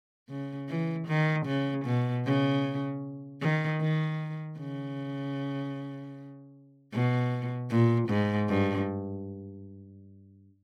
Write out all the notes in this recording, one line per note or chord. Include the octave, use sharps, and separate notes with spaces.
C#3
E3
D#3
C#3
B2
C#3
D#3
D#3
C#3
B2
A#2
G#2
G2